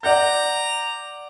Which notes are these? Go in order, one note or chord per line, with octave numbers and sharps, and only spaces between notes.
D5 F#5 A#5 G6